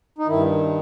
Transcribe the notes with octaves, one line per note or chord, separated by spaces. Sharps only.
D#4
G2 D#3 E4